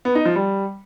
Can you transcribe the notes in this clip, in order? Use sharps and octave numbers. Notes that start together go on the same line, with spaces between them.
B3
D#4
F3
G3